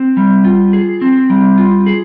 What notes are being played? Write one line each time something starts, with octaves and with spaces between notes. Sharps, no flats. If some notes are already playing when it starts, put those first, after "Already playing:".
Already playing: C4
G3
F4
G#4
C4
G3
F4
G#4